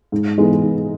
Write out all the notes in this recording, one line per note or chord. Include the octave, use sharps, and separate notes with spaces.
G#2
E3 G#3 B3 D#4
G#2